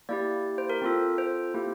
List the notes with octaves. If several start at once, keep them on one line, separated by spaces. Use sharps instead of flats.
A#3 E4 G4 D5
C5
A#4
C4 F4 A4
C5
A#3 E4 G4